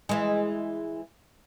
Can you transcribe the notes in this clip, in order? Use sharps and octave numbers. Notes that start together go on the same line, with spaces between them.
E3 G#3